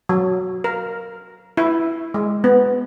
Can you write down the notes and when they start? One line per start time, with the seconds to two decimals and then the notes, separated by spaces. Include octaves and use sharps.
0.09 F#3
0.64 A#4
1.57 E4
2.14 G#3
2.44 B3